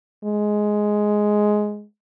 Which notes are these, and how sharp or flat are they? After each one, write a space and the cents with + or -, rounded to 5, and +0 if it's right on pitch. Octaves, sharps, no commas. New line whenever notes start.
G#3 +5